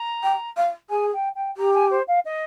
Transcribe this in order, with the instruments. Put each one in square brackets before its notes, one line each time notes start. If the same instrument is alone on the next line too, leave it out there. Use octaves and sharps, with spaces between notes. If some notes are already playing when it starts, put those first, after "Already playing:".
Already playing: [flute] A#5
[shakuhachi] G5
F5
[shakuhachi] G#4 [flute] G#5
[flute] G5
G5
[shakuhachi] G4 [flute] A#5
[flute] G#5
C5
F5
D#5